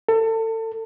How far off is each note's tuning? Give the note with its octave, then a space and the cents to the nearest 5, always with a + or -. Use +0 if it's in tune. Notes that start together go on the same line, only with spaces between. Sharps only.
A4 +30